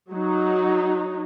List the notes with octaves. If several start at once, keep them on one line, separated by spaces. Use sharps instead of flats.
F#3 D#4